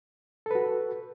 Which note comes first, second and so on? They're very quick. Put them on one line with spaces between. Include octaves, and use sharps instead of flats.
A4 B4 F#4